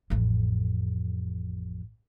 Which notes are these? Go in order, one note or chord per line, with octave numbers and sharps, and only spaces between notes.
A1 F2